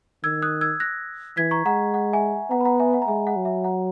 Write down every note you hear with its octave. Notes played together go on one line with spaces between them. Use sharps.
D#3 E6 G#6
D#6 F#6
E6 G#6
F#6 A#6
E3 G#6 B6
A#5 C#6
G#3 F#5 A#5
F#5
E5 G#5
B3 F#5 A#5
B5
F#5 A#5
E5 G#5
F#5
A#5
G#3 E5 G#5
F#5
F#3
E5
F#5 A#5